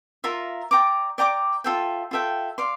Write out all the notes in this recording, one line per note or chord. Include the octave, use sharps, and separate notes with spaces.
F4 A#4 E5 A#5
D5 G5 A#5 D6
D5 G5 A#5 D6
F4 A4 E5 G5
F4 A4 E5 G5
D5 F5 C6